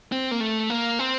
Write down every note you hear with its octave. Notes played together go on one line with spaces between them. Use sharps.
C4
A#3
A3
A#3
C4